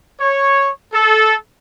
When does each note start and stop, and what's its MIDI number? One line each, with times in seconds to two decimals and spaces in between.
0.20 0.69 73
0.93 1.35 69